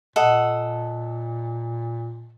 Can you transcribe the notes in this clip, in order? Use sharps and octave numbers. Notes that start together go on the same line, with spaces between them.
A#2 A4 D#5 F#5